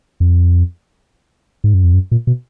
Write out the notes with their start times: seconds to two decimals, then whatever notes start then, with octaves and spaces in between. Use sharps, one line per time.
0.20 F2
1.64 G#2
1.74 F#2
1.84 F2
1.94 F#2
2.11 A#2
2.27 B2